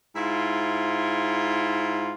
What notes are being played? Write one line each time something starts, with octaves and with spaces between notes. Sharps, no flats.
G#2 E4 F4